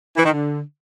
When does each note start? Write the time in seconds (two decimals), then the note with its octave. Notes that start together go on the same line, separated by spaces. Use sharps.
0.16 E3
0.24 D#3
0.32 D3